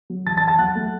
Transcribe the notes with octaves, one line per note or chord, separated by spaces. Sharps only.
F#3
E2 A5 A6
A5 A6
E2
A5 A6
F#3 F#5 F#6
A3